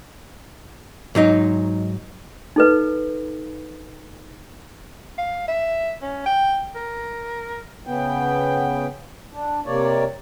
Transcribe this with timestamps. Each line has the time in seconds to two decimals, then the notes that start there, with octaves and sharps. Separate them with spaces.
1.15 G#2 F#3 D#4
2.56 D#4 A4 B4
5.18 F5
5.48 E5
6.02 C#4
6.26 G5
6.75 A#4
7.87 C#3 B3 G5
9.33 D4
9.66 C3 A#3 C#5 D5